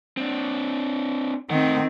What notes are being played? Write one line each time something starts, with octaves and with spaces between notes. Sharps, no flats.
C4 D4
A2 D#3 C4 F#5